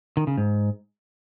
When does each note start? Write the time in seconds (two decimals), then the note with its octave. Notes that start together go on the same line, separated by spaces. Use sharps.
0.17 D#3
0.27 C#3
0.38 G#2